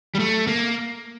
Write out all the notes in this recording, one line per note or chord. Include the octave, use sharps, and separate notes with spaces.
G3
A3
A#3